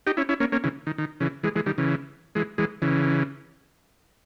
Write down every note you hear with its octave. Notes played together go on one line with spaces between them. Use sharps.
D#4 G4
C#4 E4
C#4 E4
A#3 C#4
A#3 C#4
C#3 E3
D#3
D#3
C#3 E3
E3 G#3
E3 G#3
D#3 G3
C#3 E3
E3 G#3
E3 G#3
C#3 E3